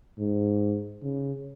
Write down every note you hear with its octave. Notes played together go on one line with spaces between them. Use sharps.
G#2
C#3